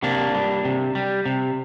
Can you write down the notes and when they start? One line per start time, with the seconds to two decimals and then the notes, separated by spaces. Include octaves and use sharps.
0.03 C3 A#3 D4
0.34 G3
0.65 C3
0.95 G3
1.25 C3